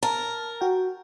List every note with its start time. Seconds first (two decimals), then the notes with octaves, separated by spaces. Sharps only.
0.03 A#4 A5
0.61 F#4 G5